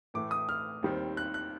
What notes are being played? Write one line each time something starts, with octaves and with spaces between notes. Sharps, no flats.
A2 E3 A3 D6
D#6
F6
D#2 D#3 G3 C4
F#6
F#6